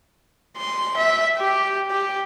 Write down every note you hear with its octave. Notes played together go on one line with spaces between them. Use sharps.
C6
E5
G4
G4